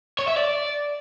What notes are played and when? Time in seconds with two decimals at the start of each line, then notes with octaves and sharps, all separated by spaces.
0.19 C#5
0.28 E5
0.36 D5